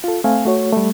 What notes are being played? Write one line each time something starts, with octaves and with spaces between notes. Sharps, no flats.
F4 A4
A3 C4 F5 G#5
A3 F#4 C#5
G3 A3